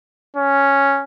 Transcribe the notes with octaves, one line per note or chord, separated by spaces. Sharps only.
C#4